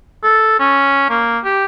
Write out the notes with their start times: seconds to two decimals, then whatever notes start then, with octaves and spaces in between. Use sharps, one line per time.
0.24 A4
0.60 C#4
1.10 A#3
1.44 G4